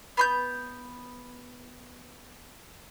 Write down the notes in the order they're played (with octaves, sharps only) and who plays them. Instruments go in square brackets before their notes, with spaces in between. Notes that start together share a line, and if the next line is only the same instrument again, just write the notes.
[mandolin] B3 C6 G6